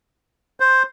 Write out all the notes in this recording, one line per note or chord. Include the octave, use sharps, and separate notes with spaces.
C5